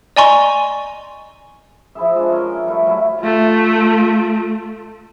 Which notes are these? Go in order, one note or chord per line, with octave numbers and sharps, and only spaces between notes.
D5 D#5 G#5 A#5 C6 C#6
F3 E4 G#4 E5
G#3 D4
C#4 A#4
G3 A3 E4
F#3 E4
A3 F4